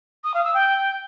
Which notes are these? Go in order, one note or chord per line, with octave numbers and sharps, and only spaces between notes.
D#6
F5
E6
G5